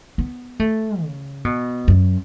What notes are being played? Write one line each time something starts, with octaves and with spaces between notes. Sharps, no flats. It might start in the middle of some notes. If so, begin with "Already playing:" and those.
B3
A3
C#3
B2
F#2